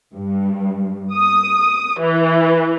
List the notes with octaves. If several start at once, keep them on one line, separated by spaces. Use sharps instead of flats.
G2
D#6
E3